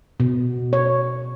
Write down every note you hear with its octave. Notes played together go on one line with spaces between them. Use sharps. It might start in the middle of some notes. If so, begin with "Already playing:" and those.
B2
C#5